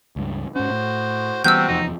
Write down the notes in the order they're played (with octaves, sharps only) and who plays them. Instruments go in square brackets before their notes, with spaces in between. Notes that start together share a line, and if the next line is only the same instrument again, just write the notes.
[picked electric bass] C#2 G2
[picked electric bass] G#2 C#4 [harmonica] F#4 C5
[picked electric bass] A2
[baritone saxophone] C3 [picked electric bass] E3 G3 B3 [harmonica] C4 F#4 [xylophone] E6 G6
[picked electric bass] F1 E2 F3 [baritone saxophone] D#4